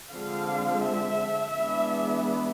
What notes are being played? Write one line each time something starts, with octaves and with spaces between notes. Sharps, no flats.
D3 F3 G#3 C4 F5
E5
E3 G#3 B3 D4